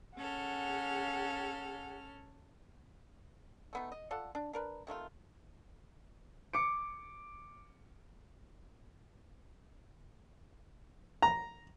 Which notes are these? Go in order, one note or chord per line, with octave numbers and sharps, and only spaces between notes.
C#4 G#4 A4 F#5 F6
A3 B3 D#4
D#5
F4 A4 D5 F#5
D4
D4 A#4 B4
C3 D#3 A3 F4
D6 C#7 D7
A#5